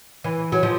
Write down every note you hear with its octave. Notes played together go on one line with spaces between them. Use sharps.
E3
F#3
F3